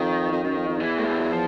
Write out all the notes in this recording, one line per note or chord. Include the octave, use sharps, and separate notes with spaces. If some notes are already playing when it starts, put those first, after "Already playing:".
Already playing: F2 D#3
F2
F#2
F2
F2
E2 E3
A3
G#3
G3
F#3
F3